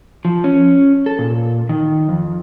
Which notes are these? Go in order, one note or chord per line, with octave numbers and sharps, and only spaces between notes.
F3
C#4
A4
A#2
D#3
F2